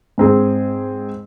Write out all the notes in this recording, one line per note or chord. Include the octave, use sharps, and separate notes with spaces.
G#2 C4 G#4